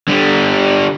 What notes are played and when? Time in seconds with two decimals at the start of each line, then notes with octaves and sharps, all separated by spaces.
0.08 D3 G3